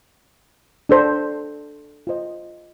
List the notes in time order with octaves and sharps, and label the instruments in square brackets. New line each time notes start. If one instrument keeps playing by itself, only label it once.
[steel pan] D4 A4 C5
F4 C5 D#5